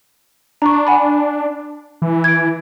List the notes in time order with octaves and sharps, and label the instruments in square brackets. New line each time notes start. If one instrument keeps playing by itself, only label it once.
[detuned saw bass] D4 [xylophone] A#5 C#6
[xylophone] F#5 G#5 B5
[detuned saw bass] E3
[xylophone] G#6 D7